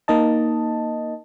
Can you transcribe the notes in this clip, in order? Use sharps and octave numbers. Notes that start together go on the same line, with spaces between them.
A#3 D#4 D#5 A5